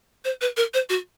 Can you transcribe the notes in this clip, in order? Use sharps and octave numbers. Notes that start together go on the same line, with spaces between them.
C5
B4
A#4
C5
F#4